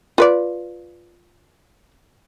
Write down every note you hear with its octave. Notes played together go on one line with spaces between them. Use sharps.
F4 B4 D5